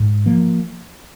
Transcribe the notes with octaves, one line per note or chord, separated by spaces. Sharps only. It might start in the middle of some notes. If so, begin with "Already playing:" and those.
Already playing: G#2
F3 A#3